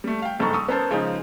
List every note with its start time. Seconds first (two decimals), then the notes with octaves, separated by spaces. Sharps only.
0.04 G3 A3
0.22 F5 G5
0.39 F#1 G2 D#4 A4 A#5 C#6
0.54 C#6 D#6 E6
0.68 B3 C#4 A#4 C5 A5
0.91 C#3 F3 G#3 D#4